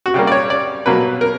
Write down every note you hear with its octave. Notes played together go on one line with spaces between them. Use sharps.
F#4
C#3 G3 A#3 G4
D5
C#5
D5
B2 F#3 A#3 B4
A#4